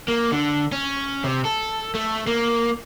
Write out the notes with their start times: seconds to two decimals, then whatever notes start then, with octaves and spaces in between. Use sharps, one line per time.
0.08 A#3
0.32 D3
0.72 C#4
1.24 C3
1.45 A4
1.95 A3
2.27 A#3